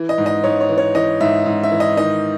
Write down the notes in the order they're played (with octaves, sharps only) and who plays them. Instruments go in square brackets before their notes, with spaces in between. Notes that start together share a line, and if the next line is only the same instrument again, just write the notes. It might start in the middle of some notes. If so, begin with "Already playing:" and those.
Already playing: [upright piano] E3
D#5
G#2
D#5
G#2 C#5
C#5
E3
C#5
E3 D#5
G#2 E5
G#2
E5
E3
D#5
D#3 D#5